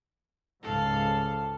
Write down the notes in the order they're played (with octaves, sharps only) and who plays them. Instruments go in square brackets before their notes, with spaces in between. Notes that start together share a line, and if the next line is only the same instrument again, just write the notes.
[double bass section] C#2 G#2 [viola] A4 F5